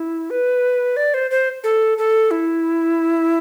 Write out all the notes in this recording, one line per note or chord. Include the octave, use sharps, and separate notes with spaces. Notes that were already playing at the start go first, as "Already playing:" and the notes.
Already playing: E4
B4
D5
C5
C5
A4
A4
E4